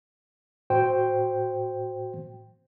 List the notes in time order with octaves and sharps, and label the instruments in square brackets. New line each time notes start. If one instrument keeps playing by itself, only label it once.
[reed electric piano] A2 F#4 C5 G5